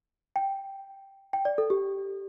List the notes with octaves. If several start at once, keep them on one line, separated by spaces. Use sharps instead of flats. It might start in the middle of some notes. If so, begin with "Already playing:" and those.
G5
G5
D5
A4
G4